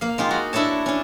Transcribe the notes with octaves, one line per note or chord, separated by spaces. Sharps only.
A#3 F5
G#3 D#4 F4 G4
F#4
D4 E4 A4 C#5 A5
C#4 D4